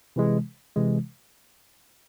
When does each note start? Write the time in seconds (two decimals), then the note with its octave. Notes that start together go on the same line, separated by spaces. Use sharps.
0.16 C3 E3 G#3
0.76 C3 E3 G#3